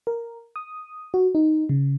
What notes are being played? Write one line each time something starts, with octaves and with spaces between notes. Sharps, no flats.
A#4
D#6
F#4
D#4
C#3